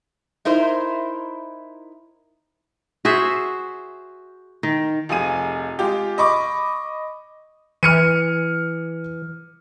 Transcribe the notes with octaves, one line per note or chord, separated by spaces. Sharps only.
D#4 E4 A#4 C5
F#4 G#4 C5 E5
D#3
F1 F3 G#4 D#7
G#3 F4 G4
D#5 B5 C#6 D6
E3 F6 C#7 D#7